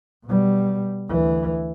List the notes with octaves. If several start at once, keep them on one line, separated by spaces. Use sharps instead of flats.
B2 G3
D2 E3